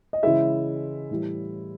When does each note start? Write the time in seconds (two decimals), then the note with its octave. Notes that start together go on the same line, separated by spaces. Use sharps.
0.13 D#5
0.23 C#3 E3 G#3 E4 E5
1.11 A2 E3 G3